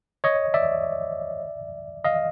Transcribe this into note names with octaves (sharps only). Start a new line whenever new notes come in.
C#5 D#5
D5 E5
D#5 F5